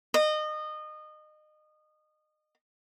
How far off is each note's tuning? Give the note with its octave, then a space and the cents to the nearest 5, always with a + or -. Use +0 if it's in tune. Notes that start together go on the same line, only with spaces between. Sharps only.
D#5 -25